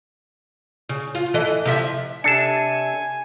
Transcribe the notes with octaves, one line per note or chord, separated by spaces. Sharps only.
C#3
F4
E3 A4 D#5
C3 F3 E5
C3 D4 A4 G#5 C#7 E7